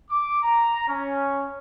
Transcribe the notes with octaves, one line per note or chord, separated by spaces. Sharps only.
D6
A#5
C#4